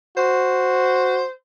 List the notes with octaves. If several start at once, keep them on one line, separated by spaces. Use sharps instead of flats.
F#4 C5